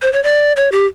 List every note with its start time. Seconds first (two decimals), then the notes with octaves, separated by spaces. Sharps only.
0.02 C5
0.13 C#5
0.24 D5
0.56 C#5
0.72 G4